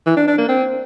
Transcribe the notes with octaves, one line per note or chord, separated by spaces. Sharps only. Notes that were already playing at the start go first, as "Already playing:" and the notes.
E3
D4
D4
A#3
C4